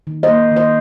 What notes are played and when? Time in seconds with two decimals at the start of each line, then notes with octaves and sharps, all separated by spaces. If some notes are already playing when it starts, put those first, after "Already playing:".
0.07 D#3
0.23 C5 D#5
0.28 A#3
0.51 D#3
0.56 C5 D#5